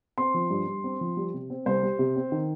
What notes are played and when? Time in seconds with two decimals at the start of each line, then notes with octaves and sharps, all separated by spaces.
0.18 C4 C6
0.34 F3
0.50 G2
0.67 G2
0.84 C4
1.01 F3
1.17 G3
1.34 C3
1.50 C4
1.66 C2 C5
1.83 G3
1.99 C3
2.16 C4
2.32 D#3